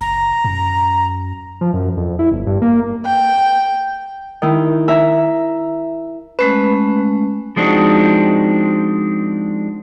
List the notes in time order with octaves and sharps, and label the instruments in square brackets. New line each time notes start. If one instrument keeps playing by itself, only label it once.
[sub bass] F#1 [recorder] A#5
[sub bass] F#2
[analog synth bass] F3
F#2
F2
E4
G1
G2
A#3
[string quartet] G5
[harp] D#3 E4
E5 A#5
[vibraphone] G#3 A3 C#4 [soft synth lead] B4
[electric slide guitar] F3 G#3 C4 D4 D#4 F#4